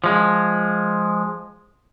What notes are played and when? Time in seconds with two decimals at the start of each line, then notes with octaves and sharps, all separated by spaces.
0.04 F3 G#3